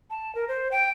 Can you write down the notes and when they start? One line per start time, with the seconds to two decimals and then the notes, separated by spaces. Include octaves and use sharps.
0.10 A5
0.35 A#4
0.48 C5
0.72 G5